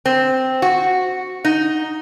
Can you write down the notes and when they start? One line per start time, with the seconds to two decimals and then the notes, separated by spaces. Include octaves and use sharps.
0.05 C4
0.62 F#4
1.45 D#4